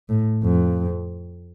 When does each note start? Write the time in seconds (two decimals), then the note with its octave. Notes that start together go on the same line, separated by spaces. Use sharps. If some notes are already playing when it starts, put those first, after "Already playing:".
0.09 A2
0.44 F2